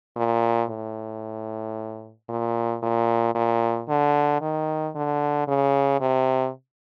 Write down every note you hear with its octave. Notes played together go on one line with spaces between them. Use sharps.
A#2
A2
A#2
A#2
A#2
D3
D#3
D3
C#3
C3